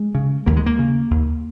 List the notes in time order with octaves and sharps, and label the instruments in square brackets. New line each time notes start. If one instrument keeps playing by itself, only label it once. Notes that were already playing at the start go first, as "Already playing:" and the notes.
Already playing: [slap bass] G#3
C#3
D#2 A#3
G#3
A#3
C#3
D#2